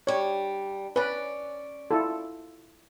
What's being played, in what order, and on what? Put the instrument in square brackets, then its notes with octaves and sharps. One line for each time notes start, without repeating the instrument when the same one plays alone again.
[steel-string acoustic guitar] G3 D4 [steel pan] C#5
[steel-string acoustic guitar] C#4 D5 [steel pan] B4
[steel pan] E4 F4 A4